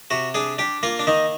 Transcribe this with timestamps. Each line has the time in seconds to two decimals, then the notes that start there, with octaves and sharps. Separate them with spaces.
0.11 C3 F#4
0.34 D4 G#4
0.58 D4 G4
0.83 A#3 F4
0.99 D4
1.07 D#3 D#4